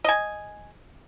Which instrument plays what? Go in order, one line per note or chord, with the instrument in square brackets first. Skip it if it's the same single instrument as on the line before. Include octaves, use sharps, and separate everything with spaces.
[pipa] D#5 G#5